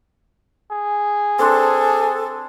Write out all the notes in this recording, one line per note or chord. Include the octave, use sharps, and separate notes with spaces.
G#4
C4 D4 A4 C6